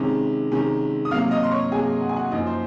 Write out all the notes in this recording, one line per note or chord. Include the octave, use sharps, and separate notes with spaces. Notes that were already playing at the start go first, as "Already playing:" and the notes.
Already playing: C3 D#3 G#3 C#4
C3 D#3 G#3 C#4
D#6
C3 F#3 A#3 F5 F6
D#5 D#6
C6
C#5 C#6
C3 F#3 A#3 G#4 G#5
F#5
G#5
F#4 F#5
F#2 F3 A#3 D#4 D#5
C5